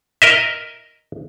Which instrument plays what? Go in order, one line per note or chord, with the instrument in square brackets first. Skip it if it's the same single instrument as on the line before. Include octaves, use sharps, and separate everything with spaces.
[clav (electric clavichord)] A#4 D#5 E5